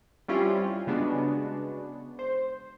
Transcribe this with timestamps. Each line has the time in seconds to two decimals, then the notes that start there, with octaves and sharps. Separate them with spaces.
0.28 G3 C4 C#4 E4 F4 G4
0.87 C#3 G#3 B3 D4 F#4
2.19 C5